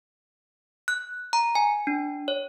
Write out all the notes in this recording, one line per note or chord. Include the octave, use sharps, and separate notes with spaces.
F#6
A#5
G#5
D4
C#5